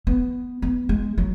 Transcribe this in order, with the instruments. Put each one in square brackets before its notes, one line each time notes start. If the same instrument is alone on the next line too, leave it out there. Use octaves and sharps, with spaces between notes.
[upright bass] B3
B3
G#3
F#3